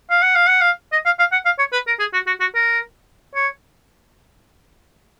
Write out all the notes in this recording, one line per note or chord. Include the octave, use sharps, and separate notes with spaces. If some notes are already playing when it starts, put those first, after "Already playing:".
F5
F#5
F5
F#5
F5
D#5
F5
F5
F#5
F5
C#5
B4
A#4
G#4
F#4
F#4
F#4
A#4
C#5